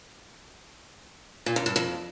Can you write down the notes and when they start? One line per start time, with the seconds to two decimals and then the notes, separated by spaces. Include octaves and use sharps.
1.46 A#2
1.56 F#2
1.66 G2
1.76 F2